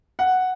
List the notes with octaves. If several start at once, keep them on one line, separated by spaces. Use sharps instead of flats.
F#5